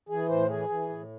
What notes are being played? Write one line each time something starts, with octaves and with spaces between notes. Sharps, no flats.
E3 G#4
A2 C5
E3 G#4
E3
A2